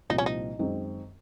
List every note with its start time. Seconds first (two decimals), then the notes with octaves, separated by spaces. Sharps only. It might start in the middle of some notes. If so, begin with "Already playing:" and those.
0.10 C2 A#2 F3 C4 D#4
0.18 C#4
0.26 D#4
0.59 F#2 D#3 G#3 C4